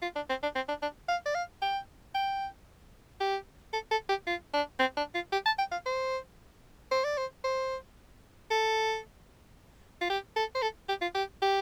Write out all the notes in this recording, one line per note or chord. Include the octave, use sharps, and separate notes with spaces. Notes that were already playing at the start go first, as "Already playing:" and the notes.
F4
D4
C4
D4
C4
D4
D4
F5
D5
F5
G5
G5
G4
A4
A4
G4
F4
D4
C4
D4
F4
G4
A5
G5
F5
C5
C5
D5
C5
C5
A4
F4
G4
A4
C5
A4
G4
F4
G4
G4